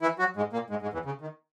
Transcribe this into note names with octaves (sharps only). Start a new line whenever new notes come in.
E3 E4
F#3 F#4
G#2 G#3
A#2 A#3
G#2 G#3
G#2 G#3
E2 E3
C#3
D#3